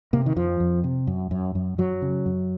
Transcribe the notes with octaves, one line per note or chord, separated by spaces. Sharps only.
C3 A#3
D#3
F2 F3
F2
C3
F#2
F#2
F#2
F#2 F#3
C#3
F#2